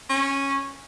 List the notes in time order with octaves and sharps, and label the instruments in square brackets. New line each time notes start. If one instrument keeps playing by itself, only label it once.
[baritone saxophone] C#4